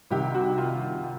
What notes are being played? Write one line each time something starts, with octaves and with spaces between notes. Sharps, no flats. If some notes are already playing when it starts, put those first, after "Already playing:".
C2 C3 D#3 G4
F#4
F4